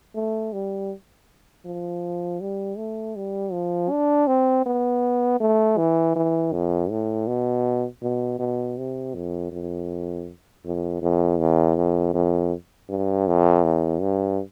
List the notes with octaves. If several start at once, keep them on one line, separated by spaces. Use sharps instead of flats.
A3
G3
F3
G3
A3
G3
F3
D4
C4
B3
A3
E3
E3
F2
A2
B2
B2
B2
C3
F2
F2
F2
F2
E2
F2
F2
G2
F2
E2
G2